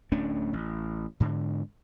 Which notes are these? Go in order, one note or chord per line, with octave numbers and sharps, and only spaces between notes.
D1 A3 C#4 D4
A1
G#2 D3